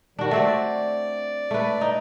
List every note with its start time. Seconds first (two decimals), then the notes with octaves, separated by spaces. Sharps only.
0.19 D#3 G3 D4 F#4
0.31 A3 C4 F#4 D5
1.51 A3 B4
1.81 D#4